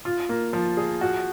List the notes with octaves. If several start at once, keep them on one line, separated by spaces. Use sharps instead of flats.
F4
A#3
F3
G#4
F#4